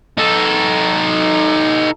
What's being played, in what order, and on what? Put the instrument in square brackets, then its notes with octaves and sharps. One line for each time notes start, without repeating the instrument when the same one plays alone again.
[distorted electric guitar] D#4 A4